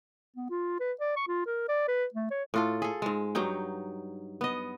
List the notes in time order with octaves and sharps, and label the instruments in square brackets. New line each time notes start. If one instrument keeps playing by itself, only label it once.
[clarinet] B3
F4
B4
D5
C#6
F4
A#4
D5
B4
A3
C#5
[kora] A2 F4 A4
G#4 A4
G#2 G#3
G2 F#3 D#4 G5
B3 D#5